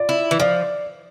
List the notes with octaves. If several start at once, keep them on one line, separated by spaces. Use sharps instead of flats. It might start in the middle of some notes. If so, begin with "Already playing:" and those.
Already playing: F4 D5
E4
E3
F3 D5